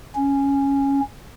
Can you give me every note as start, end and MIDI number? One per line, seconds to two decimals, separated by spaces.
0.15 1.00 61